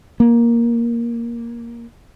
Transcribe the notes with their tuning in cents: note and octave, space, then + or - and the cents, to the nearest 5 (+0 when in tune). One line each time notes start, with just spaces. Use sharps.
A#3 +10